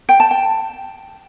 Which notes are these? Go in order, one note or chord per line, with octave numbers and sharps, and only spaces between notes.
G5
A5
G5